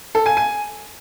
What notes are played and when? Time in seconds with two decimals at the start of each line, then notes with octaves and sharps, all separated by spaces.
0.15 A4
0.26 G#5
0.37 G#5